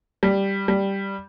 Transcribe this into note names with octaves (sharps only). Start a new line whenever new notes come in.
G3
G3